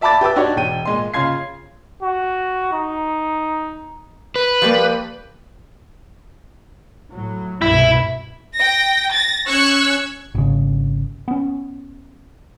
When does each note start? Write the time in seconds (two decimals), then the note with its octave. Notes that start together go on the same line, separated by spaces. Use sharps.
0.01 D5 E5 A5 B5 D6 A6
0.21 G4 B4 D6 E6
0.36 D4 D#4 F#4 G4 C#5
0.56 E1 G5 D#7
0.85 A#2 G#3 C6
1.14 C#3 F4 C6 G#6 C7
2.03 F#4
2.73 D#4
4.36 B4
4.62 F3 G3 A#3
7.13 A2 F#3
7.62 C2 G2 B2 E4
8.56 G5 A#6
9.12 A6 A#6
9.46 C#4 C#6 E6 F#6 G#6 C#7
10.35 G#1 C#3
11.28 B3 C#4